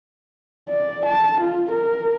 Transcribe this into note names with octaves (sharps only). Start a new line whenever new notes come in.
D5
A5
F4
A#4